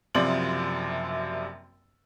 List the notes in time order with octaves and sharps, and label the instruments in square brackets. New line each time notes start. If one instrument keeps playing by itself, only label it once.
[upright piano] F#1 F#2 C3 F3 D5 F#7